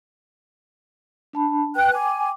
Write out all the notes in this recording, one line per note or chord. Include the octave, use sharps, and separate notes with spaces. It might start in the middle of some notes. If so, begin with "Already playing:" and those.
D4 A5 B5
B4 G5 F#6
G5 G#5 D6